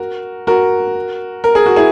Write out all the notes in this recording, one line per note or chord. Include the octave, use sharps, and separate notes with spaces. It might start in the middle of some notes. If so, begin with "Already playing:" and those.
Already playing: F#4 A#4
F#4 A#4
A#4
G#4
F#4
E4 G#4